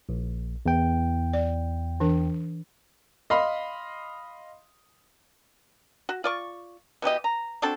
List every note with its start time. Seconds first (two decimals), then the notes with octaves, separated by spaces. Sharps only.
0.09 A#1
0.66 E2 G5
1.33 D5
2.00 E3 D4 A#4
3.30 D#5 F5 B5 C6
6.09 F#4
6.24 F4 D5 C#6
7.02 B2 E3 G4 D#5
7.24 A#5
7.62 C4 D4 F#4 A4